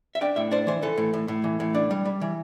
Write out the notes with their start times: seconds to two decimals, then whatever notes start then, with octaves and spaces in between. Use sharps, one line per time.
0.15 E5
0.21 D4 G5
0.36 A2 E5
0.51 D4 C5
0.67 E3 C5
0.82 E3 A4
0.97 A2
1.14 A2
1.28 A2
1.44 E3
1.60 A2
1.75 D4
1.91 G3
2.05 G3
2.21 E3